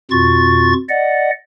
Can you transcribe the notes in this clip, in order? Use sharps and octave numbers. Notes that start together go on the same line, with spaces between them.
F2 B2 F4 C#6 A6
D5 D#5 F#5